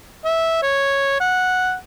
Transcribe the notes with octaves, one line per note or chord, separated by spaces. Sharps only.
E5
C#5
F#5